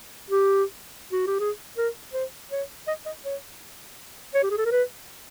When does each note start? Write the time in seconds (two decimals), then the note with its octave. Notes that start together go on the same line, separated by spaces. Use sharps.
0.30 G4
1.12 F#4
1.27 G4
1.40 G#4
1.77 A#4
2.13 C5
2.51 C#5
2.88 D#5
3.06 D#5
3.25 C#5
4.35 C#5
4.43 G4
4.51 G#4
4.58 A4
4.65 A#4
4.72 B4